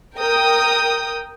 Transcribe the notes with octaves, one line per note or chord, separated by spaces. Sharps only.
A#4 G5 D#6